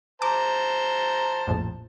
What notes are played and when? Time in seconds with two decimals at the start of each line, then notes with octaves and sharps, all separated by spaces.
0.22 C5 A5 A#5 D6
1.47 A#1 F2 A2